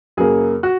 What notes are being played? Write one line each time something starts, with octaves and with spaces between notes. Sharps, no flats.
F#2 C#3 A#3 G#4
F#4